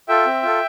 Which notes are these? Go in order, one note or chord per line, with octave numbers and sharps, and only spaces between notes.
F4 A4 E5 G5
C4
F4 A4